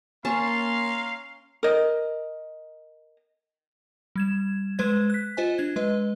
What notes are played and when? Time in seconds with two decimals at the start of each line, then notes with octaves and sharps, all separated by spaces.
0.25 A#3 C#4 C#5 F5 A5 A#5 C6
1.63 A#4 D#5
4.16 G3 G#6 E7
4.79 G#3 B4 C5 G#6
5.10 F#6 B6
5.37 F4 C5 D#5 G#5
5.58 D4 G#6
5.76 G#3 B4 D#5